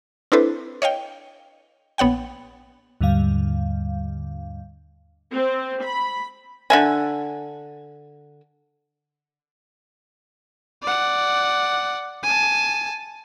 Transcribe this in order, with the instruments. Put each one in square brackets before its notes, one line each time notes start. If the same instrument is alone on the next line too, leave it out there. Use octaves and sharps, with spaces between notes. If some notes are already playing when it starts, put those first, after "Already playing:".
[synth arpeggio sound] C4 D4 E4 A4 B4 C5
C#5 D#5 F5 G5
A#1 B3 C#5 F#5 G5
[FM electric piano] D#2 G#2 D3 G3 F5
[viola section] C4
B5
[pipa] D3 E5 G#5
[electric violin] D5 F#5
G#5 A5